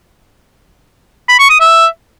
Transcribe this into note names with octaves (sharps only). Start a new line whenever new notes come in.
B5
C#6
D#6
E5